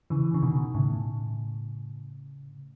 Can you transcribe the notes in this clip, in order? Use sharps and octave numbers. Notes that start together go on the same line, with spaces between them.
C#3 E3
C#3
B2 D#3
A2 C#3